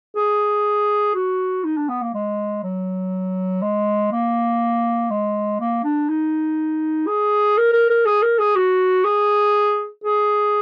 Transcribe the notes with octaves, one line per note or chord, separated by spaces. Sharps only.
G#4
F#4
D#4
D4
B3
A#3
G#3
F#3
G#3
A#3
G#3
A#3
D4
D#4
G#4
A#4
A#4
A#4
G#4
A#4
G#4
F#4
G#4
G#4